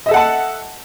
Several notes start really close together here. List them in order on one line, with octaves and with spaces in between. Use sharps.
D#5 E5 A4 F#5 A5